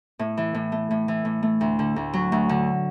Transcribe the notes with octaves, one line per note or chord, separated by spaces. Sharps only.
A2
E3
A2
A3
A2
E3
A2
A3
D2
D3
D2
F#3
D2
D3